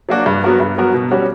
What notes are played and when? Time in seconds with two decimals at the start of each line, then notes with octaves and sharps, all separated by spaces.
0.09 F#3 A#3 D4 F#4
0.26 G2
0.44 F#3 B3 F#4 A#4
0.60 G2
0.78 F#3 B3 F#4 A#4
0.94 B2
1.11 G3 C#4 F#4